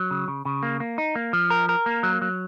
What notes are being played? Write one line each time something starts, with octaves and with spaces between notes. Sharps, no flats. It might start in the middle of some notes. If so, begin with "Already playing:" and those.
Already playing: F#3
C#3
C#3
C#3
A#3
A#3
D#4
A#3
F3
A#4
A#4
A#3
F#3
F#3